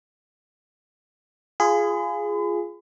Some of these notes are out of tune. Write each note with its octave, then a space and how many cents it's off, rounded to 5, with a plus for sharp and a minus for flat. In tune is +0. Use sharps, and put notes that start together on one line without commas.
F4 -5 G#4 +0 B5 +45